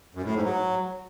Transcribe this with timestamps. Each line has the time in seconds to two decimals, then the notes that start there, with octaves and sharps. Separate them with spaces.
0.15 F#2
0.25 A2
0.35 G#2
0.45 F#3